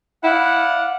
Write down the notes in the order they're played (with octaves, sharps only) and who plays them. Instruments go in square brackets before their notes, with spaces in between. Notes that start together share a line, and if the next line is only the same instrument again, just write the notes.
[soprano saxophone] E4 [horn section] D5 F5 F#5